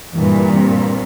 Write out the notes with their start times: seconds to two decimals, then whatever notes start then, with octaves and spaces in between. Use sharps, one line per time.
0.13 G2 A#2 E3
0.54 C4